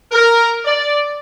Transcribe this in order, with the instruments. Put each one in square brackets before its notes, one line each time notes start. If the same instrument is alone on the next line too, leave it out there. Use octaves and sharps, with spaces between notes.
[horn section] A#4
D5